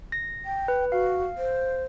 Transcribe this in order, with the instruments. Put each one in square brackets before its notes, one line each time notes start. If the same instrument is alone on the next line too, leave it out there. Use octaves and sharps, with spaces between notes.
[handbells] A#6
[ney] G5
[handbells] B4
[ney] F#4 [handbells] F5
[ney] C5